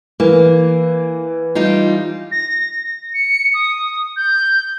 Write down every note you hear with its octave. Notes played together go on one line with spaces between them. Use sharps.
E3 A#3
G3 D#4 F4
A#6
C#7
D#6
G6